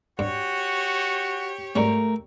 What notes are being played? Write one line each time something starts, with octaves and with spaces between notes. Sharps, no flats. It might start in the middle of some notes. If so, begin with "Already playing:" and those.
G2 F#4 G4 C#5
G#2 G3 A3 C#4 A#4